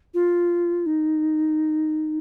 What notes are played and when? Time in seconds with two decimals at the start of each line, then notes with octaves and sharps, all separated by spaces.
0.14 F4
0.86 D#4